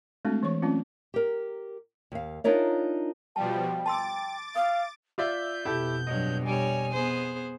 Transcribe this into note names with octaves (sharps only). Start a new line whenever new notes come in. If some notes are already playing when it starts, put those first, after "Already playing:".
G#3 A3 C4 D4 F#4 A4
E3 C#5 C#6
F#3 A3 C4 C#4 F4
G4 A#4
D#2 F5
D4 D#4 F4 A#4 C#5 E5
B2 F3 G3 G5 A5
A5 C6 D6 E6 A6
F5 D#6
F4 D5 E5 G6
F2 B2 E4 G4 A4
G2 F#3 D#5
G3 C#5 G#5
B3 G#4 C5